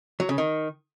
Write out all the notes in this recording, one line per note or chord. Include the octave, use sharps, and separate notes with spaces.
F#3
C#3
D#3